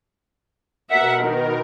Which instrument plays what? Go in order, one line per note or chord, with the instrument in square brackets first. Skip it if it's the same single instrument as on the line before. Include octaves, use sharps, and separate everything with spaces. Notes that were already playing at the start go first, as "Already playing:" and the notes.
[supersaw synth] B2 A#4 [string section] E5 F#5
[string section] D#3